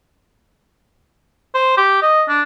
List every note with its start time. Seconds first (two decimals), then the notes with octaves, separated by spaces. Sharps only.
1.54 C5
1.78 G4
2.03 D#5
2.29 D4